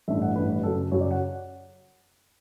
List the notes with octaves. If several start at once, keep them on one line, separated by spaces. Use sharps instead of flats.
A1 G2 E3 A3 E5
F#5
A1 G2 E3 A3 B4
F#2 C#3 F#3 A4
F#2 C#3 F#3 C#5
D5
F#5